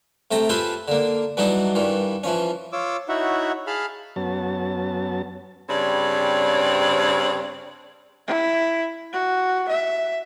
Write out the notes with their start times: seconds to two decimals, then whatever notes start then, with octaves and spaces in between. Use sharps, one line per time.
0.31 C3 A3 G5 A#5
0.49 F4 G4 A4 B4 C5 G#5
0.88 D3 A#3
1.37 E3 F#3 G3 D4 D#4 F#4
1.75 G2 D#3 E3
2.24 E3 F3 C#4
2.73 F4 C#5 D6 E6
3.09 D#4 E4 F#4 C#5 E5 F#5
3.67 G#4 F5 A5 B5 F6
4.16 F#2 F#3 B3 C#4 A5
5.70 G2 C#3 C4 C#5 D5
8.27 E4
9.13 F#4
9.68 E5